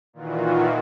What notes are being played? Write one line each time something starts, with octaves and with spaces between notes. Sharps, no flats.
A#2 D#3 E3 F4 F#4